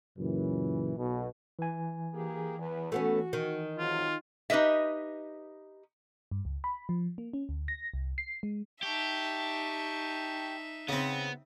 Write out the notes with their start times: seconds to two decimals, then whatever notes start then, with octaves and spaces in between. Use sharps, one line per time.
0.18 F#2 A#2 C#3 E3
0.97 B1 B2
1.59 E3 G#5
2.13 A#3 G4 G#4
2.59 E2 B4
2.92 A3 B3 C#4 F#4
3.33 D#3
3.78 C3 F#3 G#3 F4
4.50 D#4 G4 B4 D#5 E5
6.31 G2
6.45 C#2
6.64 B5
6.89 F3
7.18 A#3
7.33 C#4
7.49 D2
7.68 A#6
7.94 C2
8.18 C7
8.43 G#3
8.83 D#4 G4 E5 A5 C#6
10.89 C#3 B3 C4